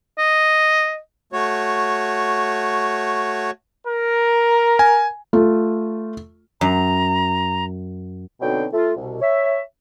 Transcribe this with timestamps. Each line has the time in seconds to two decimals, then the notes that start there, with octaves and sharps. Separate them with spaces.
0.18 D#5
1.33 A3 F#4 C#5
3.87 A#4
4.79 G#5
5.33 A3 F4
6.61 F#2 A#5
8.41 B2 D3 F#3 C4 D#4 G5
8.73 A3 F4
8.96 C2 B2
9.21 C#5 E5